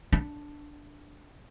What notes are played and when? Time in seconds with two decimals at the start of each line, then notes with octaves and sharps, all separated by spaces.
0.12 D4